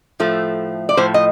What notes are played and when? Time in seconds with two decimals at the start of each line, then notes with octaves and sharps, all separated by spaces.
0.20 A2 F3 A3
0.89 D5
0.97 A2 F3 A3 C5
1.14 D#5